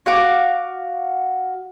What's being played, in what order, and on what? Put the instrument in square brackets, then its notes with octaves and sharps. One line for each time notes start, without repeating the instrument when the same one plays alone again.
[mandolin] F#4 F5 D6